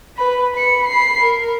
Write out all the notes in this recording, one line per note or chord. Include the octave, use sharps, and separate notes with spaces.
B4 B5
B5 C#7
B5 C7
A#4